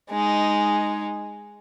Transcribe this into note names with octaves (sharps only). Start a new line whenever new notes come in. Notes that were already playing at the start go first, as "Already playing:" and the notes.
G#3 D#4